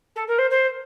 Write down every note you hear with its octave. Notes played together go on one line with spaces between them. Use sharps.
A4
A#4
C5
C5